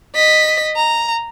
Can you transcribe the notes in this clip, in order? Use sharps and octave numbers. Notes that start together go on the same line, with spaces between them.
D#5 B6
A#5